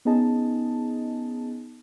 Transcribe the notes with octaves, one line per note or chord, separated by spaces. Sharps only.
B3 C#4 D#4 G#4 D#5 A5